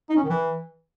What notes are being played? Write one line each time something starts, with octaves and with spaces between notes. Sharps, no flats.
D#4
C#4
D#3
E3